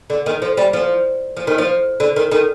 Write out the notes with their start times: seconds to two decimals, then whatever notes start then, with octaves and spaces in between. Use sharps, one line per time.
0.10 D3
0.26 D#3
0.42 F3
0.57 G3
0.73 F3
1.37 F3
1.47 D#3
1.58 F3
2.00 D3
2.16 D#3
2.32 D#3